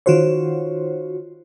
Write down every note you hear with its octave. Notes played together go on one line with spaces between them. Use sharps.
D#3 F4 F#4 C5 C#5